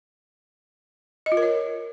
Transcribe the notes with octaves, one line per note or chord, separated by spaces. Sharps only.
D#5
F4
A#4
C#5